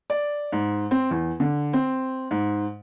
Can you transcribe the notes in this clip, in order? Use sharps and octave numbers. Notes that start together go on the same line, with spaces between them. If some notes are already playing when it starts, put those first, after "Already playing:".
D5
G#2
C4
E2
D3
C4
G#2